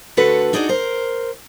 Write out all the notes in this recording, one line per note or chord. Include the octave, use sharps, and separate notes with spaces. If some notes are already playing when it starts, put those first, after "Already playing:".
D2 D3 A3 F#4 A4 B4
D4 D#4 F#4 G#4 C5 D5
A#4 C5